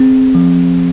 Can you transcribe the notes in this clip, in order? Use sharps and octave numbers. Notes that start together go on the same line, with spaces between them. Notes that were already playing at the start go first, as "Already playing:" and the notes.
Already playing: C4 G#4
F3